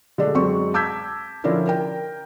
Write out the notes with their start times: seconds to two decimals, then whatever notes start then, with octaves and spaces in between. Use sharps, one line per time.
0.18 D3 G#3 A3 D4
0.35 F#2 G#3 C4 D4 C#6
0.74 A5 D6 E6 G6 G#6 B6
1.44 D3 F3 C#4 D4 E4 A#4
1.67 A#4 G5